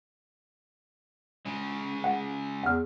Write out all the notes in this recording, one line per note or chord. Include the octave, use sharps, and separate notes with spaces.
C#3 G#3
F#5
E2 F#5 F6